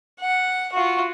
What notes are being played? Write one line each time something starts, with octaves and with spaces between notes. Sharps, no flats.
F#5
F4 F#4